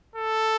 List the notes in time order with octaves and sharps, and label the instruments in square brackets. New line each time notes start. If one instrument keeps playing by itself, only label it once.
[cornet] A4